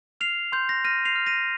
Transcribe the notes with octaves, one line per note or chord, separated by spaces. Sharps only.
F6 C7 F7
C6 G6
A#6
F6 A#6 D#7
C7 F7
F6
A#6 D#7